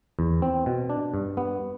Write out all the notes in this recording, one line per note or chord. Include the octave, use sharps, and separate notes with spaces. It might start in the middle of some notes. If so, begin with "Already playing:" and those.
E2
C4
B2
D4
G2
B3